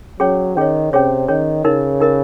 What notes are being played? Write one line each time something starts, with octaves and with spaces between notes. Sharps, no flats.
F#3 C#4 G#4 C#5
D#3 C#4 G#4 C#5
C3 C#4 G#4 C#5
D#3 C#4 G#4 C#5
C#3 D#4 A#4 D#5
D#4 A#4 D#5